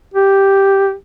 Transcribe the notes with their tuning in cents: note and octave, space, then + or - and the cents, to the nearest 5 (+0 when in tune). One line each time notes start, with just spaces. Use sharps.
G4 +0